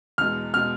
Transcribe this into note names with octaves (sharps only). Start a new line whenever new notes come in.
E2 B2 G#3 F6
B2 G#3 F6